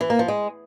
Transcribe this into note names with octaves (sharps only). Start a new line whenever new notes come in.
E3
A#3
F3
G#3